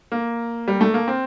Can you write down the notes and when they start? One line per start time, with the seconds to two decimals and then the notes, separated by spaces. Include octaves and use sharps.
0.12 A#3
0.68 G3
0.81 A3
0.94 A#3
1.08 C4